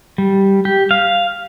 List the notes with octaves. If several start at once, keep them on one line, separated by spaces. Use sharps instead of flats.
G3
G4
F5